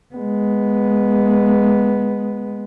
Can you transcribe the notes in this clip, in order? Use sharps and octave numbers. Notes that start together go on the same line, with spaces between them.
G#3 B3